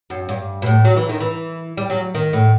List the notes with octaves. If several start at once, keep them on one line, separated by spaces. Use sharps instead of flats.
F#2
G2
B2
A2
F#3
E3
D#3
E3
G3
F#3
D#3
A2